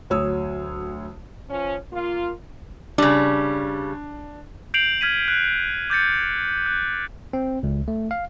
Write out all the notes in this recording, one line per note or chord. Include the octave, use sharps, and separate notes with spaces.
D2 F#3 C#5 D#6 E6
F3 C#4
A#3 F4
C#3 G3 D4
G6 C7 D7 F7 F#7
F6 G#6 B6 D#7
F#6
D6 G6 A6 C#7
F#6
C4
C#2
A3
F5